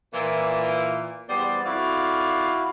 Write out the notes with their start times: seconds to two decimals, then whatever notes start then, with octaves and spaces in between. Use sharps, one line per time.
0.14 A#2 E3
1.29 E2 G3 B3 C5 D5
1.66 F2 E4 F#4 D5 F5